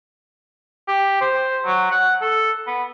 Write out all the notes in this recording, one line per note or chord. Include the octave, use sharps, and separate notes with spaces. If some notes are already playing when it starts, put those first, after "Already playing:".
G4
C5
F#3
F#5
A4
B3